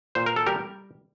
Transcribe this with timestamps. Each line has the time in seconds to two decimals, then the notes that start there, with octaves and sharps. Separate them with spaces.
0.15 A#2 C5
0.26 A#4
0.36 A4
0.46 G3 G4 A#4